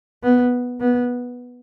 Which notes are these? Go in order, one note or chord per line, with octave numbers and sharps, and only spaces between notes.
B3
B3